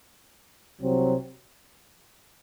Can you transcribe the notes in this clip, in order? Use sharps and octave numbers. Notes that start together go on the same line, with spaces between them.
C2 C3 F#3 C4